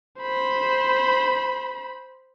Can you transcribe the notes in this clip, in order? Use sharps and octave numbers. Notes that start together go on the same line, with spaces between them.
C5 B5